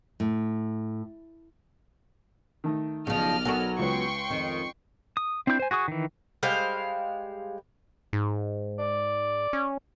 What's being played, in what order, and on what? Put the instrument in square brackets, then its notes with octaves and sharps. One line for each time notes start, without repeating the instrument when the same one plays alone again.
[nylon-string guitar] A2
[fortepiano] D#3 A3 D#4
[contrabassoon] B1 [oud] C#3 F3 [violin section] D5 D#5 F6
[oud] F#3 B3 F#4 [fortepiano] A4 A#4 G#5
[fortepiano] C#2 G#3 B4 [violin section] G5 C6 C#6
[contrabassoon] F2 [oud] D#3
[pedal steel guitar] D#6
C4 D4 E4 D6 G6
C5 G#5
F#4 G#4 C#6 D#6
D#3 E3
[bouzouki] G3 G#3 C5 F5
[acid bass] G#2
[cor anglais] D5
[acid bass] C#4